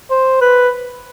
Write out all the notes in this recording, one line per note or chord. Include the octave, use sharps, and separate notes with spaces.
C5
B4